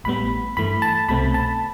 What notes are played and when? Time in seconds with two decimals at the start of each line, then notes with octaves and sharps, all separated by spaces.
0.04 A1 A2 G3 B3 B5
0.57 G2 E3 A3 B5
0.82 A5
1.09 C2 B2 A3 C4 B5
1.34 A5